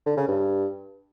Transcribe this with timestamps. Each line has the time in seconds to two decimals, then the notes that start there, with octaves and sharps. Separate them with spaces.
0.06 D3
0.17 C#3
0.28 G2